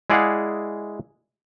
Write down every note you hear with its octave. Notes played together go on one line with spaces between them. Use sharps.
G#3 E4 G#4 D5 F5 F#5